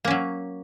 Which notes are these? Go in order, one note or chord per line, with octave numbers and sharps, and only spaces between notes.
F#3 A#3 C#4